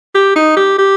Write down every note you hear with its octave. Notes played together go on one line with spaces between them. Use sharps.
G4
D#4
G4
G4